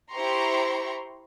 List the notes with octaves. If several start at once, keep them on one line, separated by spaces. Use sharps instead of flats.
E4 G4 C5 A#5 C6 C#6